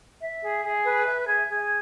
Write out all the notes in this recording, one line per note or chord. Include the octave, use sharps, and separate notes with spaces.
E5
G#4
G#4
B4
E5
G#4
G#4